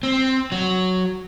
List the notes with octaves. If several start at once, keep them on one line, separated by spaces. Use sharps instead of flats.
C4
F#3